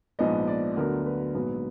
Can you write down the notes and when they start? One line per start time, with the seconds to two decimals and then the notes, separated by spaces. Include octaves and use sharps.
0.19 A#1 G#2 F3 B3 D#5
0.48 D5
0.77 D2 D3 F#3 B3 A#4
1.06 B4
1.35 A#1 G#2 F#3 B3